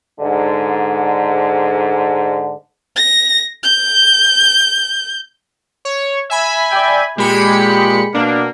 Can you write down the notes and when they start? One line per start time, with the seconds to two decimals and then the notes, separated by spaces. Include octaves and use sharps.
0.20 G#2 D3
2.96 A#6
3.63 G6
5.85 C#5
6.30 E5 G#5 B5
6.71 D5 G5
7.18 A#2 G#3 G4 B5 C#7
8.14 B2 A#3 D4